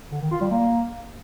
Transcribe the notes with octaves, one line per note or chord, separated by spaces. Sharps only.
D3
D#3
F4
G3
A#3